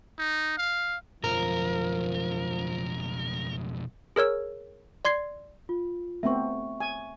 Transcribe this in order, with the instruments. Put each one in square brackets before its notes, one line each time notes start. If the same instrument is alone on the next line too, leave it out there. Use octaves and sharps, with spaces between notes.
[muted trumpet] D#4
F5
[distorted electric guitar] B1 F2 [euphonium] F3 [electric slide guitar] A#4
[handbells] G#4 A#4 C#5 E6
D5 C6 G#6 C7
[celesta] F4
[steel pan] A3 B3 C4 [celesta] E5 C#6
[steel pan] G#5